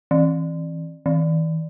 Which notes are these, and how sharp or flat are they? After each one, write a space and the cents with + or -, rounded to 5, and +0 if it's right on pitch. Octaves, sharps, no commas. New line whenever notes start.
E3 -20
E3 -45